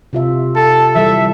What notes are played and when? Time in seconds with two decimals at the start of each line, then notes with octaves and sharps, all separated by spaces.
0.13 C3 F4 E5
0.56 A4
0.95 E3 G3 A4 E5